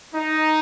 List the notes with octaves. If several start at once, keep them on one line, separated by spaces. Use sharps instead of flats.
D#4